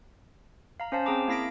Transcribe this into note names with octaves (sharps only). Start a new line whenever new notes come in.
F5 A#5
C#4 C5 F5 A5
C4 G#4 A5 A#5 D6
A#3 E4 F5 A#6 B6 D7